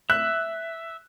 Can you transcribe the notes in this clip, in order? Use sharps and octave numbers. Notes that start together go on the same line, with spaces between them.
E5 F#6